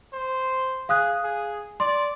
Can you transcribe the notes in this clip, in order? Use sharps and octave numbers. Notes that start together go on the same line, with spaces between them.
C5
G#4 F5 D#6 F#6
G#4
D5 C6